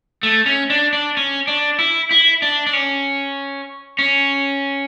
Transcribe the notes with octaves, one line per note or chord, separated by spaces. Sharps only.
A3
C#4
D4
D4
C#4
D4
E4
E4
D4
D4
C#4
C#4